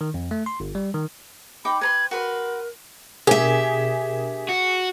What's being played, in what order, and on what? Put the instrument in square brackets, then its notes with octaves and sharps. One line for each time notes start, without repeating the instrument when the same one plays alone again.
[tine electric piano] D#3
F2
A3
C6
G1
G3
D#3
[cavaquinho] D#4 G5 D6 [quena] B5
[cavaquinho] B4 A#5 C6 [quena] G#6
[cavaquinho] F#4 B4 C6 [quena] A#4
[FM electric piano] B2 D4 A#4 [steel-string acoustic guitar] G4 E5 [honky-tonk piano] G#4
[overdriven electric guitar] F#4